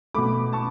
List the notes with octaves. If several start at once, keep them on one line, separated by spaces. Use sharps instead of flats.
B2 A3 B5 D6
A5 C#6